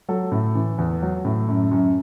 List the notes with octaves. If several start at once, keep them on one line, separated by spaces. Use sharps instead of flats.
F#3 A4
A2
E3
E2
F#3
A2
F#2
F#2